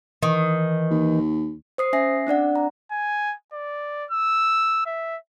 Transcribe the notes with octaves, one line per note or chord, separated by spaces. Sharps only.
D#3 E3
D#2
C5 D#6 C7
C#4 E5 G#5 A#6 C7
C4 D4 D5 F#5
A#5
G#5
D5
E6
E5